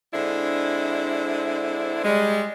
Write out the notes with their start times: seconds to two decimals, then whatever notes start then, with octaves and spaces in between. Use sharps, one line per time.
0.14 D3 G#3 C4 D4 E4
2.04 G3 G#3